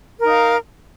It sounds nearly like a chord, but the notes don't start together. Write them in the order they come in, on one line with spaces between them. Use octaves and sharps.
A#4 D#4 F5